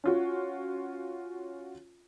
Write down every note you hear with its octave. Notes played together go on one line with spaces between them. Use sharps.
C#4 F4 F#4